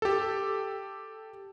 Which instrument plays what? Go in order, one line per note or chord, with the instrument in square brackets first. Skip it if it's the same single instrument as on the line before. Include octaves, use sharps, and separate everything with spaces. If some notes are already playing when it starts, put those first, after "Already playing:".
[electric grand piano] G4 A4